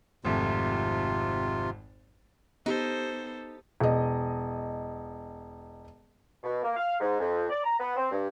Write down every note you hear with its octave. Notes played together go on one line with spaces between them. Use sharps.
G#1 F2 C3 A3 F4
B3 D#4 G4 A4 C5
E1 D#5
B2
A#3
F5
G#2
F2
D5
A#5
B3
C4
G2